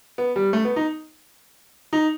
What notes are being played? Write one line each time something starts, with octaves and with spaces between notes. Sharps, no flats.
B3
G3
A3
B3
D#4
D#4